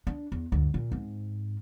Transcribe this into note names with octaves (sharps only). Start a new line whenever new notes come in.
D4
E2
D2 G2
A#2
G#2 C4